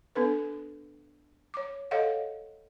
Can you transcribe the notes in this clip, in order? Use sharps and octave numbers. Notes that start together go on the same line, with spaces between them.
B3 D4 A4 B4
C#5 D6
A4 C#5 D#5 F5 F#5